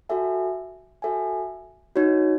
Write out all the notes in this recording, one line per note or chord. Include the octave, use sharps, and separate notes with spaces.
F#4 A4 E5 G#5
F#4 A4 E5 G#5
D#4 F#4 C#5